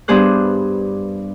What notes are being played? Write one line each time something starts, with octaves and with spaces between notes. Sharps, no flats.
G2 B3 D4 G#4 C5 F#6